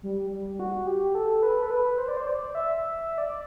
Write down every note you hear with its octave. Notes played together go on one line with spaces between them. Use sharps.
G3
G3
F#4
G4
A4
B4
A4
B4
C5
D5
C5
D5
E5
E5
E5
D5